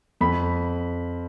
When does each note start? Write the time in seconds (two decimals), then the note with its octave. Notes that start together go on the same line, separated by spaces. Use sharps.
0.21 F2 B5